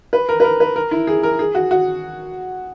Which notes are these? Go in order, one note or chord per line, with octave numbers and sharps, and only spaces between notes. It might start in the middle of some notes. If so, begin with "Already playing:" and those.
B4
A#4
B4
A#4
B4
A#4
E4
G#4
A#4
G#4
F#4
F#4